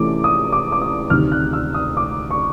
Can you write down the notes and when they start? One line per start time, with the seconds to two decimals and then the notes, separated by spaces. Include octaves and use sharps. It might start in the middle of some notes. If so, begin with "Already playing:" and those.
Already playing: C3 E3 A3 C#4 D6
0.24 D#6
0.52 D6
0.72 D6
0.82 D#6
1.10 D2 C3 D#3 F6
1.32 F#6
1.53 E6
1.74 D#6
1.97 D6
2.31 C#6